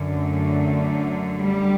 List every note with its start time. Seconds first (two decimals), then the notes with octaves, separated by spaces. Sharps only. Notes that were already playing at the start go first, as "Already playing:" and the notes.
Already playing: F#2 D3
0.11 A3
1.39 G3